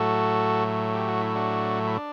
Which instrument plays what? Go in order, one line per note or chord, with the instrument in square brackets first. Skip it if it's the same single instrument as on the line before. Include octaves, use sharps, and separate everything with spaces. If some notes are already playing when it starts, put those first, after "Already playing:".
Already playing: [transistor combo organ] A2 F#3 A3 F#4 A4
G4
F#4
E4
D4 F#4
E4
D4